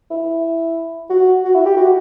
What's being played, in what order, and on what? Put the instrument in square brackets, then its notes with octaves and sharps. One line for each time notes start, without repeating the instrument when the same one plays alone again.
[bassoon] E4
F#4
F#4
E4
G4
F#4